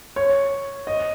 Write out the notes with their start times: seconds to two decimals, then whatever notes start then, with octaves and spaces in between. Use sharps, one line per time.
0.16 C#5
0.87 D#5